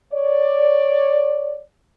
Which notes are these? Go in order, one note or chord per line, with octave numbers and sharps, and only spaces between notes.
C#5 D5